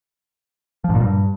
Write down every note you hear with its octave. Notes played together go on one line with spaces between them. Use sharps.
F3
G#2
A#2
G2